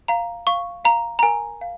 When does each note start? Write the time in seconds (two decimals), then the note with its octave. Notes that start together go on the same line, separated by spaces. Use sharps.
0.08 F5 A#5
0.47 F5 C#6
0.85 F5 A#5
1.19 A#5
1.23 A#4 G#5
1.61 F5